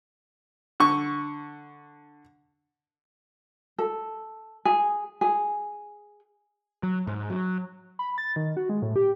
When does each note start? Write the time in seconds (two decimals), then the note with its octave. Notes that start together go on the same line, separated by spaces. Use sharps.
0.80 D3 C#6
3.78 A4
4.65 G#4
5.21 G#4
6.83 F#3
7.07 G#2
7.30 F#3
7.99 B5
8.18 A6
8.36 D#3
8.57 F#4
8.69 G#3
8.82 A2
8.96 G4